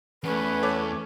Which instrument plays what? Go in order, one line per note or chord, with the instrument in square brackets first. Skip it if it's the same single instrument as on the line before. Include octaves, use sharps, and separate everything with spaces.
[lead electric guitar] E2 [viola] A3 C#4 [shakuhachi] B4
[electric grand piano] A4 C#5 D6